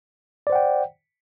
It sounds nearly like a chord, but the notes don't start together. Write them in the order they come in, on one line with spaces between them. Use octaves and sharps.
D5 C5 F#5 G5